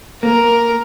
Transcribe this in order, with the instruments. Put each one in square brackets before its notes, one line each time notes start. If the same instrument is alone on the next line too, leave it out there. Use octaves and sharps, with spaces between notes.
[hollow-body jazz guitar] A#3 [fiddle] A#4